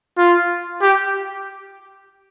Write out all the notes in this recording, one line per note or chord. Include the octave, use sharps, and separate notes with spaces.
F4
G4